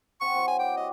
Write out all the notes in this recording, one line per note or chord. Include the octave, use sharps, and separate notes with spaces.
C4 F#5 C#6
F#3 C4 E4
G#5
D5 G5
F#4 G4 D#5